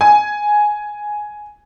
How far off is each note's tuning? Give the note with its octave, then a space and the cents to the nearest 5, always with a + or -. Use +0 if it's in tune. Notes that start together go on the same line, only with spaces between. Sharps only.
G#5 +5